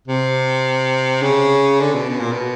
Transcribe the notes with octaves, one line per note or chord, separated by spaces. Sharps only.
C3
C#3
D3
B2
B2
A#2
B2